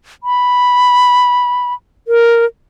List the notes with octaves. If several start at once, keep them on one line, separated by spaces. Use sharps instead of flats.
B5
A#4